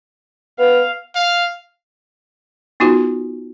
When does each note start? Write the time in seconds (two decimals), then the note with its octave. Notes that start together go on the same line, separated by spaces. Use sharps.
0.59 B3 F5
1.16 F5
2.80 B3 D#4 F4 F#4